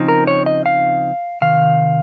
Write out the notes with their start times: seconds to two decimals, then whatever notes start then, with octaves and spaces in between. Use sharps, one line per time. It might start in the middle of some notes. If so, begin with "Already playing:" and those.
Already playing: C#3 F3 C4 D#4
0.08 A#4
0.27 C#5
0.46 D#5
0.66 F5
1.41 C3 D#3 F5